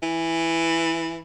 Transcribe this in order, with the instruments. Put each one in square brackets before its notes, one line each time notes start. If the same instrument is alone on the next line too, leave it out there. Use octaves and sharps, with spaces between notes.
[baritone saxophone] E3